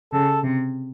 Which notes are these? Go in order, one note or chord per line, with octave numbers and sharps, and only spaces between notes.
C#3 A4
C3